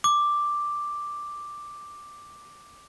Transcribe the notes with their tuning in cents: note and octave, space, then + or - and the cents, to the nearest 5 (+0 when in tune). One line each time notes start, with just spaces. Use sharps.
D6 +5